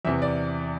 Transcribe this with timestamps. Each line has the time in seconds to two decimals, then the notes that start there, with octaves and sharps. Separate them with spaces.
0.05 E2 C3 E3 E5
0.22 D5